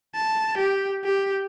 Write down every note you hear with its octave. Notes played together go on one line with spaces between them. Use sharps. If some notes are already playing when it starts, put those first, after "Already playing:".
A5
G4
G4